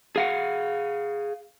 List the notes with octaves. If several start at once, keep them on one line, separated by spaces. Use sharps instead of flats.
G#4 F5 F#5